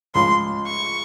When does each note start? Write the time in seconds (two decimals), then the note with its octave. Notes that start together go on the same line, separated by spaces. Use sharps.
0.14 C#2 C#3 F3 C6
0.66 C#6